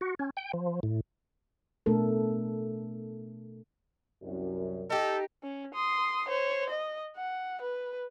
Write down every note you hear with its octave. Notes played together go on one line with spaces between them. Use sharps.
F#4
C#4
G5
F3
A2
B2 A3 D4 A4 A#4
C2 F#2
D#4 G4 A4
C#4
C6 D#6
C5 C#5
D#5
F#5
B4